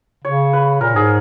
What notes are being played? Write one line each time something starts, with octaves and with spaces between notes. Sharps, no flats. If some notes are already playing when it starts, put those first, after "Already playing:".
C#3 C#5
B4
A#2 A#4
G#2 G#4